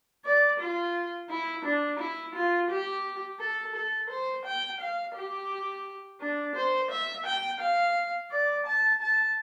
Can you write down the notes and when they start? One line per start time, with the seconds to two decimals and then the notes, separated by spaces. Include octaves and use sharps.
0.25 D5
0.60 F4
1.30 E4
1.65 D4
1.99 E4
2.35 F4
2.70 G4
3.40 A4
3.75 A4
4.10 C5
4.45 G5
4.80 F5
5.15 G4
6.20 D4
6.56 C5
6.91 E5
7.26 G5
7.60 F5
8.31 D5
8.66 A5
9.01 A5